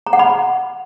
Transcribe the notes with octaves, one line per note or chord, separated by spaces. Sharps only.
A#5
F#5
B5